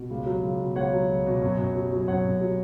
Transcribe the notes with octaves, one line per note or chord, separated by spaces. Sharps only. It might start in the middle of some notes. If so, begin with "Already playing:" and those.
Already playing: B2
C#2
F#3
C#2
B2
C#2 C#5 F#5
F#3
C#2
B2
F#2
F#2
F#3
F#3
F#2 C#5 F#5
F#2
F#3